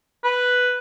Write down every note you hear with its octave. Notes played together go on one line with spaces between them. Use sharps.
B4